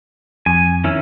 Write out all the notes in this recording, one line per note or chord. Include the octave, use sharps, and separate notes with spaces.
F2 G#5
D#3 C#4 E4